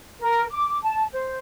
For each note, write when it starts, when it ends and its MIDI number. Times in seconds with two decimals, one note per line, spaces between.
0.20 0.44 70
0.50 0.78 86
0.83 1.03 81
1.12 1.39 72